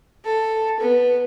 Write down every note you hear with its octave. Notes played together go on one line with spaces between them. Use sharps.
A4
B3